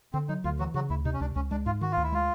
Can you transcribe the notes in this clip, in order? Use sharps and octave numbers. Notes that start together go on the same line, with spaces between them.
D3 C4
F#3 D#4
D2 F4
E3 F#3 F#4
C#3 F#3 F#4
D2 E4
C3 D#4
C#4
C#2 D4
C#2 C#4
G#3 D4
G#2 F4
D#3 F#4
D2 F4
E4
G#3 F4